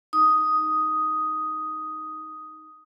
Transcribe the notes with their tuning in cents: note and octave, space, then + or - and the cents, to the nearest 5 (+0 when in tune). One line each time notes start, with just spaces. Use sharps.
D#4 +0 D#6 +5